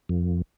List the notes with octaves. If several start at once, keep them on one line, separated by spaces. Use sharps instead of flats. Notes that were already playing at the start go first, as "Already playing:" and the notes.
F2